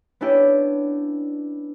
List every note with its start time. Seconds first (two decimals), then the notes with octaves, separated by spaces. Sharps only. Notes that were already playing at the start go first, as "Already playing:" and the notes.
0.21 B3 C#4 D4 E4 G4